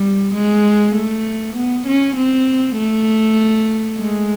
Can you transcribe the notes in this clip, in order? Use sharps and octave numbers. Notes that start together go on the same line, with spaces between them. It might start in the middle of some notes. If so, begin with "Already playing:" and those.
Already playing: G3
G#3
A3
B3
C#4
C4
A3
G#3